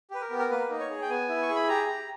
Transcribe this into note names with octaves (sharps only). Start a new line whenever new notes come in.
G4 B4
A#4
B3
A#4
A#3 B4
D#4
C#5
G#4
G5
B3 G#5
E4
C#6
G#4
B5
G4 A#5
G4